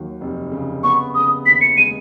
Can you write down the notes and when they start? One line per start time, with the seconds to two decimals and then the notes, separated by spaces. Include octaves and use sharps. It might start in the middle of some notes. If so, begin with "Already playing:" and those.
Already playing: D#2 F#3
0.21 F1
0.52 C#3
0.83 B3 C#6
1.15 C#3 D#6
1.46 D#2 B6
1.61 C#7
1.77 G#3 D#7